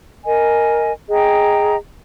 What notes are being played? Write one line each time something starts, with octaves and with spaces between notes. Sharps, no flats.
A#4 D#5 G#5
G#4 D#5 G5 A#5